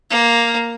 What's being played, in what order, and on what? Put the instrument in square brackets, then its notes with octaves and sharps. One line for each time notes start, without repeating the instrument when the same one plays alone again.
[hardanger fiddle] A#3